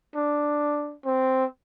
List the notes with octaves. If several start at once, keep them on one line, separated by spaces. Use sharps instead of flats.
D4
C4